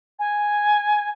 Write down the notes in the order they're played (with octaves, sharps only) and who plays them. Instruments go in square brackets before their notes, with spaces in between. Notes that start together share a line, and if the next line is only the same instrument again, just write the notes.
[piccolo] G#5